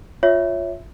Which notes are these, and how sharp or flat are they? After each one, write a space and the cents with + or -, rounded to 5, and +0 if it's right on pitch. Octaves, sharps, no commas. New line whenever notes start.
F4 +10 C#5 +0 E5 +0